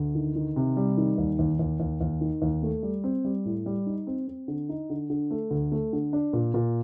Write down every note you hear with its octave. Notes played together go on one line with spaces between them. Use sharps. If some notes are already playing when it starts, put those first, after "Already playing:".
Already playing: D2
D#3
D#3
C3
G3
D#3
D#2
D#2
D#2
D#2
D#2
D#3
D#2
A3
G3
C4
G3
A2
G3
D#4
C4
C4
D3
D#4
D3
D3
A3
D2
A3
D3
D4
A#2
A#2